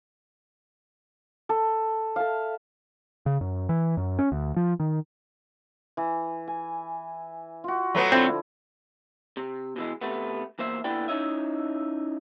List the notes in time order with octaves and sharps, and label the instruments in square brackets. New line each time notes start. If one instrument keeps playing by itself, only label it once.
[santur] A4
A4 E5 F5
[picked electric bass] C#3
F#2
E3
F#2
C#4
D2
F3
D#3
[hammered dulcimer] E3
G#5
F4 F#4
[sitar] F#3 A3 B3
[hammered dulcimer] D3 F3 E4 [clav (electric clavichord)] C4
[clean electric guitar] C3
B2 E3 G#3
C3 A3 B3
E2 A#3 C5 E5
A#2 D3 B3 E4 D5 G5
C#4 D#4 E4 C#5 D#5 E5